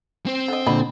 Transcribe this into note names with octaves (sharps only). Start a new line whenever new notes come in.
C4 C5
D3 D#5
A#2 D3 F#3 D#5 B5